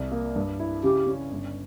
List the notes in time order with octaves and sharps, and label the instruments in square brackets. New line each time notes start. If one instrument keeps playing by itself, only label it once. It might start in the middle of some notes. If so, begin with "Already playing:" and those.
Already playing: [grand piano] C2
A#3
G2
E4
[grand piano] C#3 [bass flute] G4
[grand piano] C#4
G1